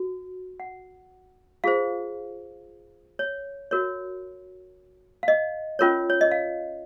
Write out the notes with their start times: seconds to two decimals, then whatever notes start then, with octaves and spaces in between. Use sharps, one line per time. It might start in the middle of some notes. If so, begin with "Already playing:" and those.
Already playing: F#4
0.60 F#5
1.64 F4 G#4 C5 F5
3.19 C#5
3.71 F#4 A#4 C#5
5.23 F5
5.28 D#5
5.79 C#4 F4 A#4 C#5
6.10 C#5
6.21 D#5
6.31 F5